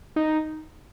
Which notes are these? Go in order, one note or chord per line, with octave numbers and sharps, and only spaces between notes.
D#4